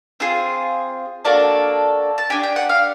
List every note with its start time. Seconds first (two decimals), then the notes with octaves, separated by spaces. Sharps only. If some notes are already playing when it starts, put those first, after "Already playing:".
0.20 C4 F4 G#4
1.25 A#3 D4 F#4 A4 A5
2.18 A5
2.30 D4 G4 G#5
2.43 G5
2.56 F#5
2.69 F5